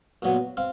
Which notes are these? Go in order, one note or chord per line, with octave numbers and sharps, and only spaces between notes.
A#2 F#3 B3
C4 F5